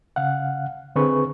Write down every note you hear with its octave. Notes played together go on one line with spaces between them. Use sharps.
C#3 F5 F#5
D3 C4 G#4 B4 C#6